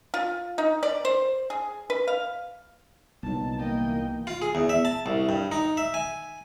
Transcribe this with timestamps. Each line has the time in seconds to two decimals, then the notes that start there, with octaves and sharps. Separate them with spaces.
0.14 F4
0.58 D#4
0.83 D5
1.05 C5
1.50 G#4
1.90 B4
2.08 F5
3.23 C2 A#2 F#3 B3 D#4 A5
3.59 E3 A#3 D#5 G5
4.27 F4
4.42 G#4
4.55 E2
4.69 E5
4.85 A5
5.06 C2
5.29 G2
5.52 D#4
5.77 E5
5.94 G#5